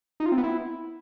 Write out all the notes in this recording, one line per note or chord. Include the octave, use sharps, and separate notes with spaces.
D#4
F4
C4
B3
E4